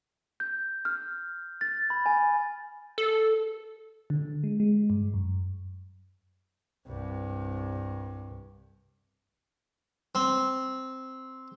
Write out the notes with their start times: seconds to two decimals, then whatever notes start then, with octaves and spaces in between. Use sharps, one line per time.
0.40 G6
0.85 F6
1.61 A6
1.90 B5
2.06 G#5
2.98 A4
4.10 D3
4.44 G#3
4.60 G#3
4.90 G2
5.14 F#2
6.87 C2 G2
10.15 C4